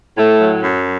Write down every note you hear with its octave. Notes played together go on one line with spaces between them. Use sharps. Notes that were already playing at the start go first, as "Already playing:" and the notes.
A2 A3
F#3
F#2